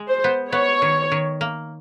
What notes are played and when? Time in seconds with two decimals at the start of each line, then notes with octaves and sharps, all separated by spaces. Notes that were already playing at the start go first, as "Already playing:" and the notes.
Already playing: G#3
0.09 C5
0.24 B3
0.52 B3 C#5
0.82 D#3
1.12 D#3
1.41 A#3